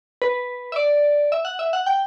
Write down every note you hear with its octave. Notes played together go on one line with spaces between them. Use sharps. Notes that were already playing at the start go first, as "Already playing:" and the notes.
B4
E5
D5
E5
F#5
E5
F#5
G5